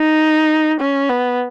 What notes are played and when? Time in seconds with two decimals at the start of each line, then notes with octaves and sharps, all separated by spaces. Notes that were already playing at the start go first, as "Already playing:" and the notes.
Already playing: D#4
0.80 C#4
1.09 B3